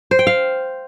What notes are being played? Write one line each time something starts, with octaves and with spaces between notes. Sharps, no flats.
C5
G5
F5